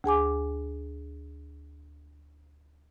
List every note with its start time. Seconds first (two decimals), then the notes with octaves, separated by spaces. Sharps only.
0.04 D2 G#4 G#5 D6